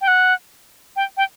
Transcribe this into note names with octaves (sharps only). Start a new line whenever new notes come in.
G5
F#5
G5
G5